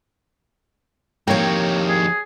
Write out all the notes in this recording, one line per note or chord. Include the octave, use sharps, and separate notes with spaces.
F2 D#3 A#3 G4 C#5 G5
G#4